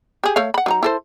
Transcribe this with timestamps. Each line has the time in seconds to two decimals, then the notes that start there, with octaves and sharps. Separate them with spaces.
0.24 G4 G#4
0.36 A3 C#5 F5
0.54 F#5 B5
0.66 F#3 D#4 A#5
0.83 E4 A4 C5